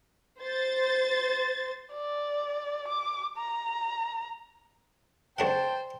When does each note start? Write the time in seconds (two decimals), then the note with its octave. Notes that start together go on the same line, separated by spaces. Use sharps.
0.40 C5 A6
1.93 D5
2.88 D6
3.38 A#5
5.39 C#2 D4 C5 F#5 G5 A5